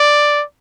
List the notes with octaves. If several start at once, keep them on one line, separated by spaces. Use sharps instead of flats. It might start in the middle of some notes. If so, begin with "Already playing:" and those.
Already playing: D5